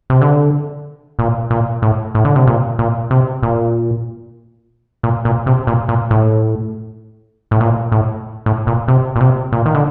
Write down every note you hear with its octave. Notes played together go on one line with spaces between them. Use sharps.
C3
D3
A#2
A#2
A2
A2
D3
C3
A#2
A#2
C3
A#2
A#2
A#2
C3
A#2
A#2
A2
A2
A#2
A2
A2
A#2
C3
A#2
C3
A#2
D#3
D3